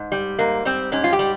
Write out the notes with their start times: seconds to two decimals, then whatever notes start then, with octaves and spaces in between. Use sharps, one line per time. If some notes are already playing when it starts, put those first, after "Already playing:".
Already playing: G#2
0.12 G3
0.39 G#2 A#3
0.65 G3 C4
0.92 G#2 C#4
1.04 F4
1.13 G4
1.19 G3